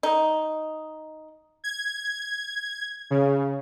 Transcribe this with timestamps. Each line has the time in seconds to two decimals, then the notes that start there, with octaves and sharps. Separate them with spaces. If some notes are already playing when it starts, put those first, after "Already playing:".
0.03 D#4
1.64 G#6
3.10 C#3